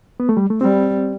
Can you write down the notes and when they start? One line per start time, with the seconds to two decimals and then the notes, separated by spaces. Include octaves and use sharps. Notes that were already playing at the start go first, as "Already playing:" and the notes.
0.20 B3
0.29 A3
0.37 G3
0.50 A3
0.61 G3 C4